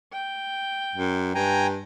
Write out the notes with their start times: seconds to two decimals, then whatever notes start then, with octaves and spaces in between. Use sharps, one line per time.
0.13 G5
0.95 F#2
1.35 G2 G5 G#5 A#5